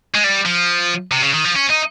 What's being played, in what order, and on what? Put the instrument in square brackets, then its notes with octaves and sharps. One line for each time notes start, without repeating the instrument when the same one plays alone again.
[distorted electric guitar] G#3
G3
F3
C3
C#3
D#3
F3
C#4
D#4